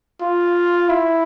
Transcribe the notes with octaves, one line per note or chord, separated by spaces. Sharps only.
F4
E4